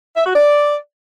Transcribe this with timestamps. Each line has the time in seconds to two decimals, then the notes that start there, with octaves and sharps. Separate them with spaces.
0.17 E5
0.26 F#4
0.35 D5